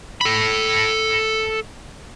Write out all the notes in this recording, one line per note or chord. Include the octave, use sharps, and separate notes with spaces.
A4 B5